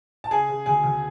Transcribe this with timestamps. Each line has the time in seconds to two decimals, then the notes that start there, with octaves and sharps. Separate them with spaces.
0.24 A5
0.31 C#3 G#4 G#5
0.49 C#3
0.66 D2 G#4 G#5
0.84 D2